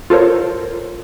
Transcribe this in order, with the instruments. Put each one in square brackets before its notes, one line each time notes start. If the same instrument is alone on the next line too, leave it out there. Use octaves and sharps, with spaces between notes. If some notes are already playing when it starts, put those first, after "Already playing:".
[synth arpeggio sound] F4 A4 A#4 C5 C#5